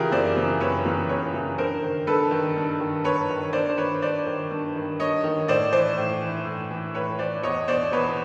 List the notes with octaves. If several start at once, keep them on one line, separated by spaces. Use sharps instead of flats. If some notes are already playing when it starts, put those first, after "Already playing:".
Already playing: C#3 E3 F4 G4 G#4 A#4
F#2 C5 D5
C#3 E3
F#2 B4 C#5
C#3 E3
F#2 B4 C#5
C#3 E3
G2 A#4 C5
D#3
G2 A4 B4
D#3
G2
D#3
G2 B4 C#5
D#3
G2 C5 D5
C5
D#3 B4 C#5
G2 C5 D5
D#3
G2
D#3
G2 C#5 D#5
D#3
A2 C5 D5
E3 C5 D5
A2
E3
A2
E3
A2 B4 C#5
E3 C5 D5
E2 C#5 D#5
B2 C5 D5
E2 B4 C#5